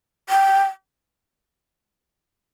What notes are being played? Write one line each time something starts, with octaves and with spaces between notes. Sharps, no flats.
G5